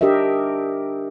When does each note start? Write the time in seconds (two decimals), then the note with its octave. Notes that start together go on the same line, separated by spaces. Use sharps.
0.01 D4 G4 A#4 D#5 E5